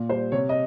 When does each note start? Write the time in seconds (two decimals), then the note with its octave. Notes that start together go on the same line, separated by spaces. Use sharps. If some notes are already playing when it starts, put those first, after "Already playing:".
Already playing: A#2
0.09 G3 C5
0.32 C3 C#5
0.49 D#5